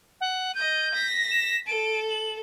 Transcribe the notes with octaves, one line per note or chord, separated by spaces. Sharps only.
F#5
D#5 G6 D#7
A#6 B6
E7
A4 D7
F#7